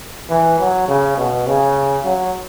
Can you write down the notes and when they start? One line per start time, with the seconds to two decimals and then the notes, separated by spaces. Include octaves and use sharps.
0.30 E3
0.59 F#3
0.88 C#3
1.17 B2
1.47 C#3
2.04 F#3